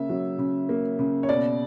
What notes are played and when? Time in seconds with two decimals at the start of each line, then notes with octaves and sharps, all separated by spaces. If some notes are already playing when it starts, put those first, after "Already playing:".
Already playing: C#3 A#3 E5
0.09 F#3
0.38 C#3
0.69 A#3
0.99 C#3
1.23 C#5
1.29 B2 D5